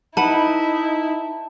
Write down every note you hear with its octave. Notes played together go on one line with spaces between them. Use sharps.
D#4 E4 B4 F#5 A5